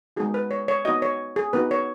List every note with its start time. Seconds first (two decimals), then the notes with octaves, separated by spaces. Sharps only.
0.16 G#3 B3 D#4 F#4 G#4
0.34 B4
0.51 C#5
0.68 C#5
0.85 B3 D#4 F#4 D#5
1.02 C#5
1.36 G#4
1.53 B3 D#4 F#4 B4
1.71 C#5